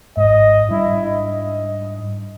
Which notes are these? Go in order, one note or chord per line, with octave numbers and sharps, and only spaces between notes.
G#1 G#2 D#5
G#2 G3 D4 E4
D#5